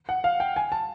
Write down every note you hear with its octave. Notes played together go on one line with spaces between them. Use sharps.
F#5
F5
G5
G#5
A5